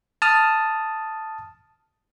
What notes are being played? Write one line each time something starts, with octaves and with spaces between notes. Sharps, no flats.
A5 D#6 F6